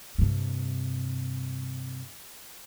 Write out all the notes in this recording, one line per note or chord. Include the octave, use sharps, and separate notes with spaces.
G2 C3